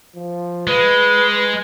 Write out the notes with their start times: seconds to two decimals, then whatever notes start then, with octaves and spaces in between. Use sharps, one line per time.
0.15 F3
0.67 G#3 B4